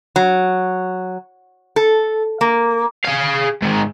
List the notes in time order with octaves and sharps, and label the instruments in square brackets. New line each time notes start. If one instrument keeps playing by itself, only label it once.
[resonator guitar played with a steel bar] F#3
A4
A#3
[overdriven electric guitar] G#4 F5
G#2 D#3